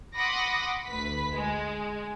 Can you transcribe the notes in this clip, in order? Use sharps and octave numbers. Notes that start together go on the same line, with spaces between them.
F#5 B5 C6 D6 D#6 A#6
D2 B4 B6
G#3